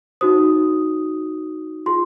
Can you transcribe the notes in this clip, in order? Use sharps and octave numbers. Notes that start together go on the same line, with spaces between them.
D#4 F#4 C5 D#6
F4 G#4 C6